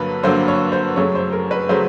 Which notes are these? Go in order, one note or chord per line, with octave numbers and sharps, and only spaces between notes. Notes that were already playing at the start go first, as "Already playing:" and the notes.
Already playing: G2 D3 F#3 A#3 B4
G2 D3 F#3 A#3 C5
C#5
C5
F#2 C#3 F#3 A3 C#5
C5
A#4
B4
C#3 F#3 A3 C5